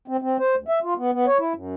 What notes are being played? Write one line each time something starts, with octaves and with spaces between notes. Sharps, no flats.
C4
C4
C5
D2
E5
F4
B3
B3
C#5
E4
F#2